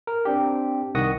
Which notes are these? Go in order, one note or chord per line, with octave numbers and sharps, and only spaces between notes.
A#4
C4 D4 G4
C2 D#3 F#5 C#6 D#6 A#6